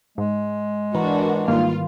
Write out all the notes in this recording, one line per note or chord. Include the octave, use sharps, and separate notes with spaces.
G#2 G#3
E3 D4 F#4 A#4 B4
G#2 D#3 G3 A#3 F4